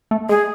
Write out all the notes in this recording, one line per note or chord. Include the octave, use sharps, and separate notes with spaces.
A3
G#3 G#4